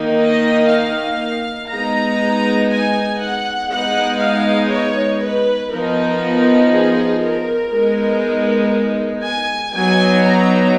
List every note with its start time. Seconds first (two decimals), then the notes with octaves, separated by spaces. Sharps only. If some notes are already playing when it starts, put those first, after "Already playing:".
Already playing: D#3 A#3 D#4
0.20 D#5
0.70 F5
1.70 G#3 B3 D#4 A#5
2.70 G#5
3.20 F#5
3.71 G#3 B3 D#4 F#5
4.21 F5
4.71 C#5
5.22 B4
5.71 F3 B3 D#4 A#4
6.72 G#4
7.22 A#4
7.72 G#3 B3 D#4
9.23 G#5
9.73 F#3 B3 D#4 G#5
10.23 A#5